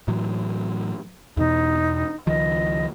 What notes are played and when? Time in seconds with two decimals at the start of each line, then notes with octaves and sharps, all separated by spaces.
0.08 A2 E3 F#3
1.37 E2 B2 D#4
2.27 C#2 D#3 F3 D#5